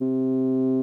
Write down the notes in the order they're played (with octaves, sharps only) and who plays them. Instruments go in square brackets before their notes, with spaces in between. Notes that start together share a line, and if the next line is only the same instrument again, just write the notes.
[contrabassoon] C3